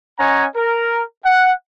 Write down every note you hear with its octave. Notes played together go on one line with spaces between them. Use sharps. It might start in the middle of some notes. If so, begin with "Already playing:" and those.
C#4 C#5 D#5 F#5 G#5 A#5
A#4
F#5